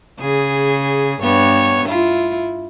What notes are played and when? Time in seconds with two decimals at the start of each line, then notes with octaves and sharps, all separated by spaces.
0.20 C#3 G#4
1.22 G2 B3 C#5
1.89 E4 F4